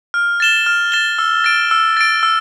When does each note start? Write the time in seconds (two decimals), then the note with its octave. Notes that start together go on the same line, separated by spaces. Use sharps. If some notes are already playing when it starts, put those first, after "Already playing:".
0.14 F6
0.40 A6 E7 G7
0.66 F6
0.92 A6 E7 G7
1.18 E6
1.44 A6 D7
1.71 E6
1.97 A6 D7
2.23 E6